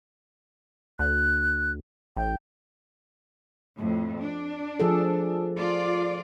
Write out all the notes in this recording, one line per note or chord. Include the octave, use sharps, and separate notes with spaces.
D2 F#6
A1 G5
F2 A2
D4
F3 G#4 A4
F4 D5